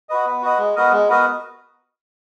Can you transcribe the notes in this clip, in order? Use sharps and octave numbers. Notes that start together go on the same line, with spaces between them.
F#4 B4 D#5
B3
F#4 B4 D#5
G#3
B3 F#4 A#4 D#5
G#3
B3 F#4 A#4 D#5